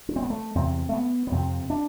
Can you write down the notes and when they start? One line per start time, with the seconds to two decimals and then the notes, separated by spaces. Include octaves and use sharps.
0.09 D4
0.16 C4
0.22 B3
0.30 A3
0.55 E2 C3 C4
0.89 A3
0.93 B3
1.27 B3
1.31 F2 C3 C4
1.70 D4